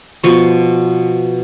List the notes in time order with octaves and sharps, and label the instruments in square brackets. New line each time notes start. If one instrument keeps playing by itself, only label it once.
[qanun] B2 F3 C#6